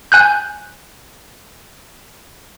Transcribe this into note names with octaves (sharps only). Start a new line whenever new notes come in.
G#5 F#6 G6